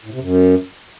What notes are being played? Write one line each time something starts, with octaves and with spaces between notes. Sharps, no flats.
A2
C3
F#2